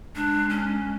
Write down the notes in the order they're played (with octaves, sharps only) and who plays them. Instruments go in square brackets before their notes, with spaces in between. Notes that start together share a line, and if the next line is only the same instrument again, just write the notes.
[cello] G#3 [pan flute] D4
[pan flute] C#4